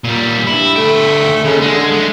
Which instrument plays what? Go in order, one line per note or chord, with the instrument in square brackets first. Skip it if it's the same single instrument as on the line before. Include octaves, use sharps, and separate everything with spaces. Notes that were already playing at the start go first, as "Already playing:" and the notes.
[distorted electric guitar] A#2 G3
[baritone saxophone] G2 [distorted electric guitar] E4
[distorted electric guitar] D2 G5 [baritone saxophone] A3
[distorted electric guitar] D#2 [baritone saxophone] C#3
[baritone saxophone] D3 [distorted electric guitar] G#3
[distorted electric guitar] G#3 A3